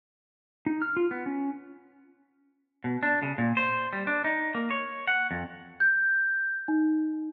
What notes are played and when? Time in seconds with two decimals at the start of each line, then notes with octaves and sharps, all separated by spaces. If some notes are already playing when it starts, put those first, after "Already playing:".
0.66 D#4
0.82 F6
0.97 F4
1.11 B3
1.26 C#4
2.84 B2
3.03 D4
3.22 C#3
3.38 A#2
3.57 C5
3.93 G3
4.07 D4
4.24 D#4
4.55 A#3
4.71 C#5
5.07 F#5
5.31 F2
5.80 G6
6.68 D#4